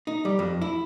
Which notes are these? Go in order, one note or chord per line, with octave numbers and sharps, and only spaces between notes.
D#4
G3
F2
E4